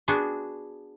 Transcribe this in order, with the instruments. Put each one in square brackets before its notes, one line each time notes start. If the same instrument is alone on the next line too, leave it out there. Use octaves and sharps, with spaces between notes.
[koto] B3 D4 F#4 G#4